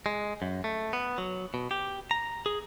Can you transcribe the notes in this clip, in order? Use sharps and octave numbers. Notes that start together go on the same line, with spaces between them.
G#3
F#2
A3
B3
F#3
B2
G4
A#5
G#4